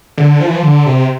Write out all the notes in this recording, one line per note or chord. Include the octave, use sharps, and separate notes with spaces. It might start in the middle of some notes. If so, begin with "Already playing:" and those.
D3
F3
E3
F3
D3
C3